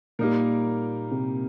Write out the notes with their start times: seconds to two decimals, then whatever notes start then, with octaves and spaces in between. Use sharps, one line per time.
0.19 A#2 G3 A#3 D#4 A#4
1.11 C3